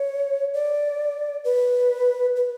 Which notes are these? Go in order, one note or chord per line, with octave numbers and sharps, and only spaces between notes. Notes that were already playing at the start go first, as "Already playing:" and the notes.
Already playing: C#5
D5
B4
B4